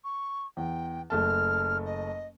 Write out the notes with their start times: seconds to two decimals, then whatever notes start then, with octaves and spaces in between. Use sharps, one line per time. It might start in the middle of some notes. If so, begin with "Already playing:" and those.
0.04 C#6
0.57 E2 G5
1.10 F#1 A3 A5 F6
1.85 D#5